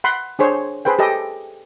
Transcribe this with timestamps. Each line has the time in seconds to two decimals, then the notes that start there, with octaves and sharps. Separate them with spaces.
0.04 F#5 B5 C6
0.39 D4 G#4 C5 C#5
0.85 G#4 B4 C5 G5
0.99 G4 A4 D#5